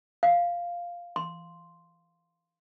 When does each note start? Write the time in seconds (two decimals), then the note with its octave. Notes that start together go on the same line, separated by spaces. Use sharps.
0.23 F5
1.16 C6